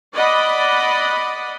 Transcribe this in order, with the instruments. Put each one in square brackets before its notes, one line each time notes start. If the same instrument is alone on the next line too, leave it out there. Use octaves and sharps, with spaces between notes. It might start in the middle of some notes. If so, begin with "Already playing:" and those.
[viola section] D5 D#5 F#5 B5